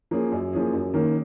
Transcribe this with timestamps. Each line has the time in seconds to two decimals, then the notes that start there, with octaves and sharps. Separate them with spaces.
0.11 F3 A#3 C#4 G#4
0.32 F#2
0.53 F3 A#3 C#4 G#4
0.73 F#2
0.94 D#3 A#3 C#4